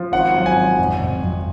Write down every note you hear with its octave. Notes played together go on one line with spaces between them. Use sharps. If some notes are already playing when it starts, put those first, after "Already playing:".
Already playing: F3
G#1 F#5
F#3
G#5
G#1
F2
F2
F2